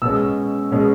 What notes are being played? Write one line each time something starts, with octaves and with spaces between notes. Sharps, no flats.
B2 G#3 C#4 E6
B2 G#3 C#4